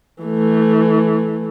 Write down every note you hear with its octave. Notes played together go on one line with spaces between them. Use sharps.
E3 A3